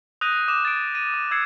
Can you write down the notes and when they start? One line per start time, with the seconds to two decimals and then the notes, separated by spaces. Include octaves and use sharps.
0.21 D#6 F#6 G6 A#6 D#7
0.48 D6 D#6 E7
0.65 A6 D7
0.95 A6 D#7
1.14 D#6
1.31 E6 G#6 C7 C#7